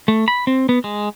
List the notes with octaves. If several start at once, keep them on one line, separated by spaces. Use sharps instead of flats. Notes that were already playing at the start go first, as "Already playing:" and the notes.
A3
B5
C4
B3
G#3